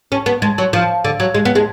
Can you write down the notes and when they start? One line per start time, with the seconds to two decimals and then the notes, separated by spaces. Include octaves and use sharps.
0.12 C#4
0.26 B3
0.42 G#3
0.58 F#3
0.73 F3
1.04 D3
1.20 F#3
1.34 G#3
1.45 B3
1.55 G#3